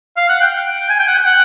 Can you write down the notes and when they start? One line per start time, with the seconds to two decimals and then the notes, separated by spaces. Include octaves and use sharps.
0.17 F5
0.29 F#5
0.41 G5
0.90 G#5
0.99 G5
1.08 F#5
1.18 G5
1.26 F#5